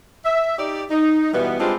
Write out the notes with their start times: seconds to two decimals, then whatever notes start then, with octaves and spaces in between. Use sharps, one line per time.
0.25 E5
0.59 D#4 G4 D5
0.91 D#4
1.33 B2 E3 G3 B3
1.59 G3 G#3 C4 D4 F4 G4